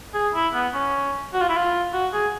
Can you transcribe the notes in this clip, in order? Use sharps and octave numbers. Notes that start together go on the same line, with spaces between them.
G#4
E4
B3
C#4
F#4
F4
E4
F4
F#4
G#4